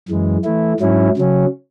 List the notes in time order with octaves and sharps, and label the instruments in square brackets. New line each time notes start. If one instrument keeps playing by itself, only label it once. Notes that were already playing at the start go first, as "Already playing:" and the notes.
[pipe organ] F#2 E3 G#3
E3 A3 E4
G#2 F#3 C#4 E4
C#3 F#3 C#4